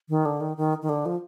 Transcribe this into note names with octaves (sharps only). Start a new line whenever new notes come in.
D#3
D3
D#3
D#3
D#3
D3
F3